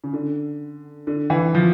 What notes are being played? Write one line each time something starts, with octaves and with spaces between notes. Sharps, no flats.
C#3
D3
D3
E3
F3